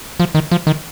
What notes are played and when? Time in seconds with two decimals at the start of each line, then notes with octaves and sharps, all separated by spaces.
0.20 F3
0.35 D#3
0.52 F3
0.67 D#3